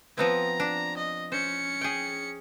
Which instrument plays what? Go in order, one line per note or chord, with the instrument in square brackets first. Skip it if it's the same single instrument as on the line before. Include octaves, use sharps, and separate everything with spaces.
[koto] F3 B3 C4 [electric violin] A#5
[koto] D4
[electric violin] D#5
[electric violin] C#4 C#7 [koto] C5
[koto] G#4 G5